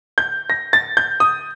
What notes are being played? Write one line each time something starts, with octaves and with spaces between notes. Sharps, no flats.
G6
A#6
A6
G6
D#6